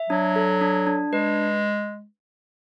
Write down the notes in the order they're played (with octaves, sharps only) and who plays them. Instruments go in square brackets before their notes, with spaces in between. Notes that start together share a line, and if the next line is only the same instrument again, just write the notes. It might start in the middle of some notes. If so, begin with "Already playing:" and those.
Already playing: [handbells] E5
[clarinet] F#3 [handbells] D4
[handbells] A4
D4
D4
[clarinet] G#3 [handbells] B4